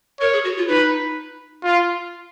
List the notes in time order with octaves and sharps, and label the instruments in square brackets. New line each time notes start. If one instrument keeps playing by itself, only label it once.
[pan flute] A#4 [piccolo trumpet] C#5
[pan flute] G#4
F#4
F4
[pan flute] D#4 [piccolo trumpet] B4
[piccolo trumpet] F4